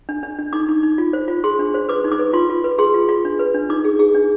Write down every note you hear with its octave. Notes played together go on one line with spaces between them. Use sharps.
D4
D4
D4
D#4 D6
D#4
D#4
F4
C5
F4
G#4 C6
D4
C5
B4 D6
D#4
D6
B4
F4 C6
F4
B4
G#4 C6
F4
F4
D4
B4
D4
D#4 D6
G#4
G#4
D4